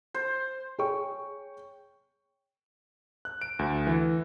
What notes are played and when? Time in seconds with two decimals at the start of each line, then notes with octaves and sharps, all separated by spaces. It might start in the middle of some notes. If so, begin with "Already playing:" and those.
0.14 C5
0.79 G#4 C#5 G5 C#6
3.25 F#6
3.42 D7
3.59 D2
3.87 E3